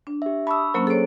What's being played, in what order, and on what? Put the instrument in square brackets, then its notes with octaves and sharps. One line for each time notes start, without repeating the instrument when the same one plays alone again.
[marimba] D4
[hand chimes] G4 E5
[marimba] A5 D#6 [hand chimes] B5 C#6 E6
[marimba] F#3 A#3 C#4 [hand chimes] A#4 C5
[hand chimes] G#4 D7 [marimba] A4 C5 C#5